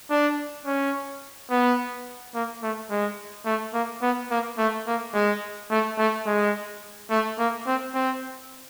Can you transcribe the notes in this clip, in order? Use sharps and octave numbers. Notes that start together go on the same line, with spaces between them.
D4
C#4
B3
A#3
A3
G#3
A3
A#3
B3
A#3
A3
A#3
G#3
A3
A3
G#3
A3
A#3
C4
C4